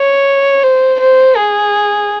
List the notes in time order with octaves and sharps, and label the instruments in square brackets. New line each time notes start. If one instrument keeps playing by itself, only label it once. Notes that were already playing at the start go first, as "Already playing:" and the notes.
Already playing: [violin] C#5
C5
C5
G#4